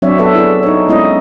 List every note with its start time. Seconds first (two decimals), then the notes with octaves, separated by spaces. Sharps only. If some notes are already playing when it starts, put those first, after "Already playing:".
0.02 F#3 C4 D4 C#5 D5 E5
0.18 F#3 B3 A4 B4 E5
0.35 E4 G#4 D5
0.63 D#4 C#5
0.88 G#3 B3 C#4 E4 D#5